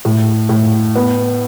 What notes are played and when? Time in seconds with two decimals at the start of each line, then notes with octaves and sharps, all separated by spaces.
0.05 A2
0.49 A2
0.95 B3